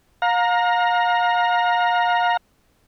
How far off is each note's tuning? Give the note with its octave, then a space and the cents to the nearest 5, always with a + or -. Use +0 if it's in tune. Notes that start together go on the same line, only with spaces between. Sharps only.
F5 +35 A#5 +0